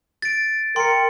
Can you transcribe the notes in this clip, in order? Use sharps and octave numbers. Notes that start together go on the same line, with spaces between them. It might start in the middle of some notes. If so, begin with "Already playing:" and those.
A6 D7
A#4 G5 C6 C#7